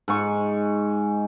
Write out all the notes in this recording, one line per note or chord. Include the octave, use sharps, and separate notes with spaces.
G#2 G#3 C#6